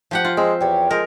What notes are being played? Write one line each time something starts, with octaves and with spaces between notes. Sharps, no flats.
F3 G4 F#5
F4
G#3 C4
E2 G4 C#5
F3 G#3 A#4